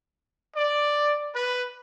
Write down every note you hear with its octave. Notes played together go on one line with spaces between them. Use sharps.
D5
B4